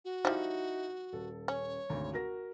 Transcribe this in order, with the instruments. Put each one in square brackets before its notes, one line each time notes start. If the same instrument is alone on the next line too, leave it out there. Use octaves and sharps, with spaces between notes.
[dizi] F#4
[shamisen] F3 G3 [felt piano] D#4 E4
[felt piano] D#1 A4
[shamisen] C#4 [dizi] C#5
[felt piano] G#1 D2
F#4 A#4 A#6